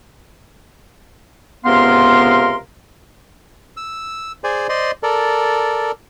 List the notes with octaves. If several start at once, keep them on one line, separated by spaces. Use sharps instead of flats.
C#2 C3 B3 A#4 F5 C6
E6
G#4 C5 D5 G#5
C5 D5 D#5 C6
A4 A#4 D5